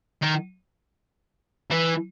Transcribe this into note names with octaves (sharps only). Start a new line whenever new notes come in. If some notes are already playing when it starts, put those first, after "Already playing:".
D#3
E3